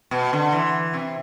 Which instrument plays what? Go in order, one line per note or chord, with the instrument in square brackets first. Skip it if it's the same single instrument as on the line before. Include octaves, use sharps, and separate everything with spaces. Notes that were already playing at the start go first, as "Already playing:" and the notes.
[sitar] B2
D3
E3
C3